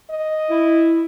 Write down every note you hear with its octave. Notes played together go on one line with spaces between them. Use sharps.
D#5
E4